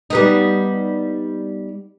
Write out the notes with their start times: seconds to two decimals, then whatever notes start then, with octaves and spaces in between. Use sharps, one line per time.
0.10 G3 B3 D#4